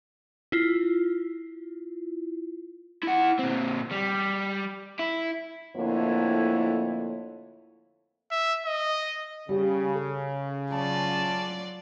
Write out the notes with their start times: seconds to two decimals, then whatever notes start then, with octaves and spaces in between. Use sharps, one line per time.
0.52 E4 F4
3.03 E4 F#5
3.39 A#2 C4
3.91 G3
4.99 E4
5.76 F2 A2 D3 A#3 E4 C#5
8.31 E5
8.65 D#5
9.49 C#3 G3
9.95 A4
10.72 F#3 C#4 F4 D5 A5